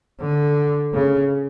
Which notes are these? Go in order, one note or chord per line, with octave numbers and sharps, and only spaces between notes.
D3
C#3